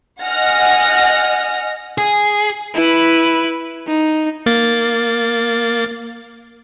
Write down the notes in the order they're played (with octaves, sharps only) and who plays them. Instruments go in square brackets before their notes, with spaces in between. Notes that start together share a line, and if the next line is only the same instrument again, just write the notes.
[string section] D#5 F#5 G#5 F6 A#6
[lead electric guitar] G#4
[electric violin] E4 B4
D#4
[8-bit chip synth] A#3 A6